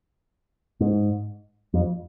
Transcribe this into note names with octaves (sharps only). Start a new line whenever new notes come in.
G#2
F2